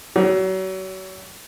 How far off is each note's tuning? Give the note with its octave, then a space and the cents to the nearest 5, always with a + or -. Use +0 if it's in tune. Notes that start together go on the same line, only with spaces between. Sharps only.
F#3 +35